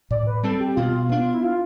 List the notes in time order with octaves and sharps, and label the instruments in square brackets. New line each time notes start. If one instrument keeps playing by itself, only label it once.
[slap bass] A2 [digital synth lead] D5
[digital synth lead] B4
[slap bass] G3 C4 [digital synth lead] A4
[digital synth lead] G4
[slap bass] B2 [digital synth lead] F4
[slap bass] B3 D4 [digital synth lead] F4
[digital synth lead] E4
F4